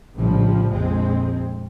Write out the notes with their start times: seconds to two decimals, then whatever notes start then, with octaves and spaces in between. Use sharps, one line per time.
0.15 A#1 A2 C#3 F3 G3
0.71 A#1 F2 G#3 C4